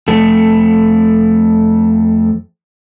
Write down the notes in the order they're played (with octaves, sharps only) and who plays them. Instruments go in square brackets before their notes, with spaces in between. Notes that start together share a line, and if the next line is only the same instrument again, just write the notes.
[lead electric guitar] F2 A3